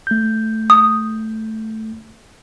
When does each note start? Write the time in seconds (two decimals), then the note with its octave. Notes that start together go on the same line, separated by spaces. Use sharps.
0.07 A3 G6
0.70 D#6